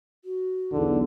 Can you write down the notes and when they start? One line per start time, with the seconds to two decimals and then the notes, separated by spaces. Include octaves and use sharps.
0.24 F#4
0.72 B1 E2 D3